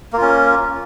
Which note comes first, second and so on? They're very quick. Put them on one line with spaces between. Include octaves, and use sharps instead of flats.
A#3 F4 C#4